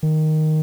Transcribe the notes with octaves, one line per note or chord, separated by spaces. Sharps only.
D#3